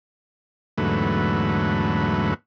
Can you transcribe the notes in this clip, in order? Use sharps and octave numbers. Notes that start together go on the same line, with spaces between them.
E2 G#2 D3 F#3 A3 B4